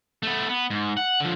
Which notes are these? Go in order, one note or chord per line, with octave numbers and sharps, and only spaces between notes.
A3 B3
B3
G#2
F#5
D3 F3